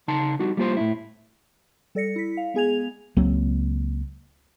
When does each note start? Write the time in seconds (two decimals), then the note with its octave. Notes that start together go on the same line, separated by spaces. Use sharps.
0.08 C#3 D#4 A5 C6
0.39 G3 D#4 F#4
0.57 G3 A#3 F4 C5 C6
0.77 A2 D4 E4
1.95 G3 A4 D5 A#6 C#7
2.16 E4 B6
2.37 F5
2.54 G#3 B3 G#4 G#5 G#6 F7
3.17 C#2 F#3 A#3 C4